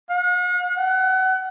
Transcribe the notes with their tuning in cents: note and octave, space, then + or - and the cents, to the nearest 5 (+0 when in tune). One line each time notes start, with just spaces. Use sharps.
F#5 -45
F#5 +30